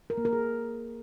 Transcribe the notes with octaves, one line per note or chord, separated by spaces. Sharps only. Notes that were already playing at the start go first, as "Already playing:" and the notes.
A#4
A#3
A#4
G#4